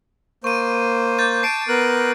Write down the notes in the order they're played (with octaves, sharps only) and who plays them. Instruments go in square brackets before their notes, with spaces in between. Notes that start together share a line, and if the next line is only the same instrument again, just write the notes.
[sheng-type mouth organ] A#3 C5 [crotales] C#6 D#7
[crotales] D6 G6 A6
[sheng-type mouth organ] A5 [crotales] C7 D7 D#7
[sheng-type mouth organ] B3 A#4 F#6